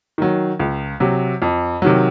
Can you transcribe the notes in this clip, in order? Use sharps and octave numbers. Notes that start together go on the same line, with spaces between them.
D#3 F#3
C#2
C3 F#3
F2
C3 D#3 F#3